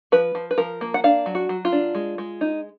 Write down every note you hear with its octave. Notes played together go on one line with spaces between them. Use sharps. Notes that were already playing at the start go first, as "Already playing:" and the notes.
F3 B4
F3
B4
F3 A#4
A#3
F#5
D4 F5
F#3
F#4
F#3
F4
D4
G#3
G#3
D#4